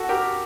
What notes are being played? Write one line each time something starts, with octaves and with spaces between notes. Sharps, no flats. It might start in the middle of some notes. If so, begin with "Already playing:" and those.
Already playing: F#4 A4
G4 A#4